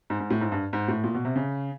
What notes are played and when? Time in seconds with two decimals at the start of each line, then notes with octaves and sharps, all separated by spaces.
0.10 G#2
0.20 G#2
0.30 A2
0.41 G#2
0.52 G2
0.73 G#2
0.88 A2
1.04 A#2
1.15 B2
1.25 C3
1.36 C#3